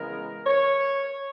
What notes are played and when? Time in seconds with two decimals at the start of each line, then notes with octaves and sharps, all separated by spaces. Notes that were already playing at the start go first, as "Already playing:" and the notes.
Already playing: C#3 E3 G#3 B3 A#4
0.46 C#5